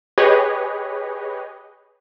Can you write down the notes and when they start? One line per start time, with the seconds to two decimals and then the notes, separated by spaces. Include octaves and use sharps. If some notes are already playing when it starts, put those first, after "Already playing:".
0.18 G4 G#4 B4 C#5 D#5